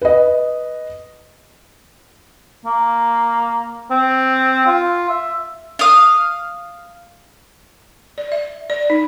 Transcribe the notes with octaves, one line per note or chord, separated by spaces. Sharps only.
B4 D#5
A#3
C4
F4
E5
F5 D#6
D5
E5
D5
D#4